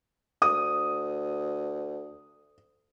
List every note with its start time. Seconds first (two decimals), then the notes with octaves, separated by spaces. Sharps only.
0.42 D2 D#6